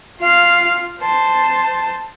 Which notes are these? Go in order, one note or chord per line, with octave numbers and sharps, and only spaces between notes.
F4 F5
C5 A5